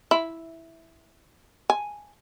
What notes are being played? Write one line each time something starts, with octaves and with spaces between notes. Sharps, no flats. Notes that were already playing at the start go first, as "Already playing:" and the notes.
E4
G#5